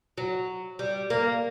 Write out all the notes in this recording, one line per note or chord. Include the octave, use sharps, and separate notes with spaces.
F#3
G3
A#3